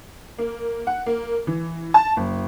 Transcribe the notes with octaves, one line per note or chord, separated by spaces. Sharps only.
A#3
F#5
A#3
E3
A5
F#1